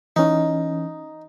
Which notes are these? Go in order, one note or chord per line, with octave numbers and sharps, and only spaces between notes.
E3 C#4 D#4